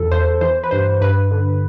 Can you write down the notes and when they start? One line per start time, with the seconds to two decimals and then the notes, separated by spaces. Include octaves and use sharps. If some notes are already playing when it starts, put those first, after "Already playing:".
Already playing: E2 E3 A4
0.12 E2 C5
0.41 E3 C5
0.64 B4
0.71 G2 C5
1.01 G2 B4
1.31 D3